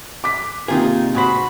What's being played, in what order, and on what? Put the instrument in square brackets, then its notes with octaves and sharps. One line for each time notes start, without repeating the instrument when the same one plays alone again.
[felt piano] D6 B6
[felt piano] C3 D#3 A#3 [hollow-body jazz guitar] D#4 F4 G#4
[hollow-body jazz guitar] G#2 C5 [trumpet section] F#4 B5